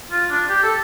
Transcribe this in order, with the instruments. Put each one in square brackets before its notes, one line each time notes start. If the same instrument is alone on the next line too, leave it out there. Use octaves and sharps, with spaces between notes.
[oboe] F4
D4
G4
A4